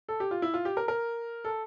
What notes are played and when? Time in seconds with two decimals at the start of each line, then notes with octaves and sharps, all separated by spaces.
0.09 A4
0.20 G4
0.31 F4
0.42 E4
0.54 F4
0.65 G4
0.77 A#4
0.88 A#4
1.44 A4